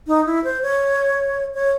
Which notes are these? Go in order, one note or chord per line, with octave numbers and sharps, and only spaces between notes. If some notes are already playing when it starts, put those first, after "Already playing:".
D#4
E4
C5
C#5
C#5